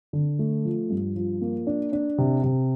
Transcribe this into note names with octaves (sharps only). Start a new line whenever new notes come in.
D3
A3
F3
G2
F3
A#3
D4
D4
C3
C3